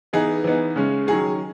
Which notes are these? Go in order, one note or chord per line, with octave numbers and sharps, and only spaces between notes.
E3 B3 D#4 G#4
E3 B3 D#4
C#3 G#3 C#4
D#3 F#3 C#4 G#4